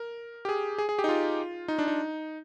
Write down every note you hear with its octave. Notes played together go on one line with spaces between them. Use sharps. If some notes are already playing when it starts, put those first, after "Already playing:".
Already playing: A#4
G4
G#4
G#4
G#4
G4
D#4
F4
D#4
D4
D#4